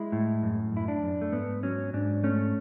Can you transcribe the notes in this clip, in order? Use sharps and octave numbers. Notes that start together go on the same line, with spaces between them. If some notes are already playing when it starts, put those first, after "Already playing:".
Already playing: G#3 E4
A2
F#2
F#2 E4
D4
F#2
A3
G#2 B3
F#3 C#4
G#2 D4
A3 C#4